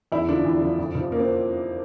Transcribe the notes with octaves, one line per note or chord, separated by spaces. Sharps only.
E2 E4
D3 F3 D4
E2
D3 F3
F2
C3 F3
A#3
C4